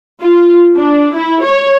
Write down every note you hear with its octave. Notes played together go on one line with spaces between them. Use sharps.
F4
D4
E4
C#5